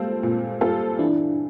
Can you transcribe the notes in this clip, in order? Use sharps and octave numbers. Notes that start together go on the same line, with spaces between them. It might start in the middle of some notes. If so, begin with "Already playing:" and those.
Already playing: A#2 G3 G#3 A#3 C4 F4 A4
A#2
G3 C4 F4 A4
E3 D4 E4